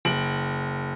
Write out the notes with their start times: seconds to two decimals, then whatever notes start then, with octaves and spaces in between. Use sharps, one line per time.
0.05 F#1 D7 F#7